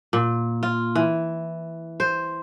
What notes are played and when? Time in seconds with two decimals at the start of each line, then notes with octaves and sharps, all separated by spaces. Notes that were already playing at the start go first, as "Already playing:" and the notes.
0.13 A#2
0.63 F4
0.95 E3
2.00 C5